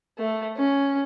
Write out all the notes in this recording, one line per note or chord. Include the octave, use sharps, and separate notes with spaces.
A3
C#4